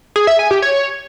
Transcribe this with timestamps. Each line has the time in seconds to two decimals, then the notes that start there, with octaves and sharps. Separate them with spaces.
0.16 G#4
0.27 E5
0.39 G#5
0.51 G4
0.62 C#5